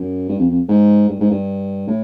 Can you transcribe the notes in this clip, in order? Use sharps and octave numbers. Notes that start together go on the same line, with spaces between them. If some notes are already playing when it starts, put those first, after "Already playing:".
Already playing: F#2
G2
F2
F2
G#2
G2
G#2
G2
A2